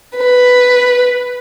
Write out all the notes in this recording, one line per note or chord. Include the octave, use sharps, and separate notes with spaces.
B4